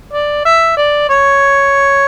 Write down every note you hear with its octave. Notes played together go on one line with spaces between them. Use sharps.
D5
E5
D5
C#5